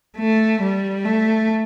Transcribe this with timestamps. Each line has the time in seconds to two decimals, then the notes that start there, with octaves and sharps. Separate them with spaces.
0.17 A3
0.62 G3
1.05 A3